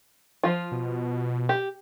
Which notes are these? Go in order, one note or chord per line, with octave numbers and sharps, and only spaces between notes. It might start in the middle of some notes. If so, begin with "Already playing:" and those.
F3 F4
B2
G4